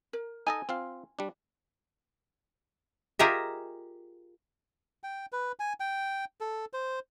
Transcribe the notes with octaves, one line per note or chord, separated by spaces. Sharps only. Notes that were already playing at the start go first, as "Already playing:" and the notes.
A#4
D#4 A4 D#5 G#5
C4 F4 F5
G3 D4
F4 G4 G#4 A#4 D#5 E5
G5
B4
G#5
G5
A4
C5